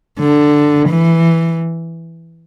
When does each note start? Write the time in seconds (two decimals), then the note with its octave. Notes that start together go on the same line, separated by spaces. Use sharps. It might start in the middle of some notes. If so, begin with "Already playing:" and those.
0.19 D3
0.89 E3